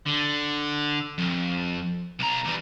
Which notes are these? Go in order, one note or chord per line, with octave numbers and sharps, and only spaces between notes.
D3
F2
B1 A#5
E3 G3